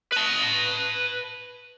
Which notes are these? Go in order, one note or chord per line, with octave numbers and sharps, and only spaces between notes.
B4 A5